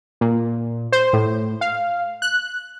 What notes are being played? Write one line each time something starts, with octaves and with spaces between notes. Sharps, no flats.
A#2
C5
A2
F5
F#6